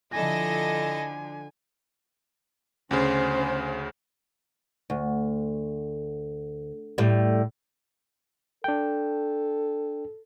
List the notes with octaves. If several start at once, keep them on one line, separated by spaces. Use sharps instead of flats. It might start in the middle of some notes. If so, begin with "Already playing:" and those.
D3 F3 E4 A4 D#5 G#5 A#6
D2 C#3 C#4 C5
D2
A2 G3
D4 A4 G5